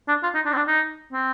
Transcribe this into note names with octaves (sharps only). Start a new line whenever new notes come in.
D4
F4
D#4
D4
C4
D4
D#4
C4